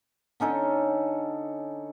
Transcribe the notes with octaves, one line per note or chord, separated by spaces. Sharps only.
D3 C#4 D#4 A4